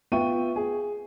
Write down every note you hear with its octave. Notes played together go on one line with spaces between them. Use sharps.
B3 F4 E5 G5 C#6 D#7
G#4